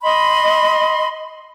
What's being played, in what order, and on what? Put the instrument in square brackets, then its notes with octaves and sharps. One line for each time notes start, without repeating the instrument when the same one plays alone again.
[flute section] D#5 B5 C6